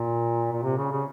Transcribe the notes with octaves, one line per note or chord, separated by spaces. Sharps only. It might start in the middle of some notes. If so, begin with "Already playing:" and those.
Already playing: A#2
A#2
C3
C#3
C#3